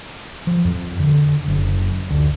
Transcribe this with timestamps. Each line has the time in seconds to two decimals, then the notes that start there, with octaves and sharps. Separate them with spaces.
0.47 F3
0.65 F2
1.00 D3
1.48 F#1
2.10 D2